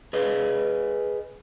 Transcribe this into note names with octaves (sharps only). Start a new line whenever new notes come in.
G#4 B4 D#5